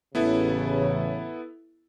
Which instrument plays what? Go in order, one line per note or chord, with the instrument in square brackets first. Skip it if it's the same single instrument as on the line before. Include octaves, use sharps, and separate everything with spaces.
[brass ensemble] A1 C#3 [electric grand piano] B3 E4 A4